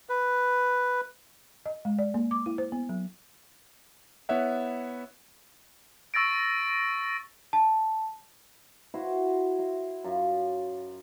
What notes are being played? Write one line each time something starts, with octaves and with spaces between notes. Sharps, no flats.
B4
D#5
G#3
D5
A#3
D6
E4
C5
B3
F#3
B3 E4 C#5 E5 F#5
C#6 E6 A6 A#6 D7
A5
E4 F#4 C5
E5 C6
F#2 F4